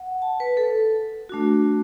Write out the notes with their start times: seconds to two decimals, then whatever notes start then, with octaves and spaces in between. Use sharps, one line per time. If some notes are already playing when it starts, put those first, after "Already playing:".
Already playing: F#5
0.22 A5
0.40 B4
0.57 A4
1.29 A3 D4 F#4